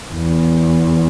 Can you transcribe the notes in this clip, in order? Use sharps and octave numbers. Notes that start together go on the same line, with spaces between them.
E2